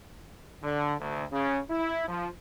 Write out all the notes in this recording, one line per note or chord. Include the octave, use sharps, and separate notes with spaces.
D3
D2
C#3
E4
F3